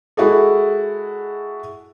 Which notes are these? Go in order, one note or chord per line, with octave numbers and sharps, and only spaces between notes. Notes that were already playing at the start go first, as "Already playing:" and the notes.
G#3 E4 F#4 G#4 A4